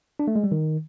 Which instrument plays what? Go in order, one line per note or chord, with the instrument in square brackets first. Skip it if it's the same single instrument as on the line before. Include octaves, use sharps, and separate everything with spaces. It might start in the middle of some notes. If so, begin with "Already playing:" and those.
[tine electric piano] D4
A3
G#3
G3
D#3